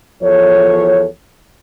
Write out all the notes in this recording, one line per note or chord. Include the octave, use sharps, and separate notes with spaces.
E2 F3 A4 C#5